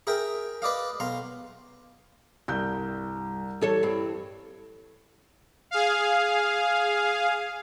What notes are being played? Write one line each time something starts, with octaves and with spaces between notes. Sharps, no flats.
G#4 A#4 E5 G5
B4 D5 D#5 F5
B1 F5 A#5 C6
C2 G2 G6
E3 G3 A4 C#5
G2 C4
G#4 F5